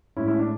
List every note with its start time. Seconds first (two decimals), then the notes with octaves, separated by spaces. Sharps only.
0.16 A2 G#3 C#4 E4
0.27 C#4 E4
0.39 D4